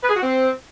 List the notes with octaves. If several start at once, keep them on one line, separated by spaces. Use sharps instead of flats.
B4
G#4
F#4
C4